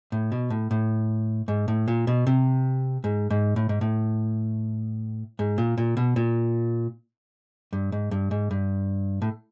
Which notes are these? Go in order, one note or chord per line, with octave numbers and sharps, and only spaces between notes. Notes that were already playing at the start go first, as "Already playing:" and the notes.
A2
B2
A2
A2
G#2
A2
A#2
B2
C3
G#2
G#2
A2
G#2
A2
G#2
A#2
A#2
B2
A#2
G2
G#2
G2
G#2
G2
A2